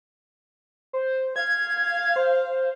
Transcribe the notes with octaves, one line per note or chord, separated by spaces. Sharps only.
C5
F5 G#6
C5